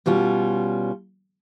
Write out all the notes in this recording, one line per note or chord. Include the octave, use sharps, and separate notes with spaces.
B2 G3 C#4 F4